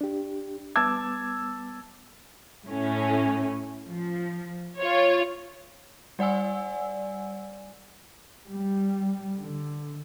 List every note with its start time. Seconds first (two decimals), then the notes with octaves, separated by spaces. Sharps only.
0.01 D4 G4
0.76 G3 B3 A5 D6 E6 G#6
2.68 A2 C#4
3.88 F3
4.80 F4 C#5
6.19 G3 D5 F#5 G#5 E6
8.46 G3
9.39 D3